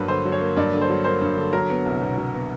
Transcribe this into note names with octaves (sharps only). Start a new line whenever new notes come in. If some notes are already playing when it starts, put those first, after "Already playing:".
Already playing: G2 F#3 A#3 B4
D3 C5
F#3
C#5
A#3
G2 D5
D3
C5
F#3
A#3 C5
G2
D3
F#3 A#4
B3
C2
B2
F#3
B3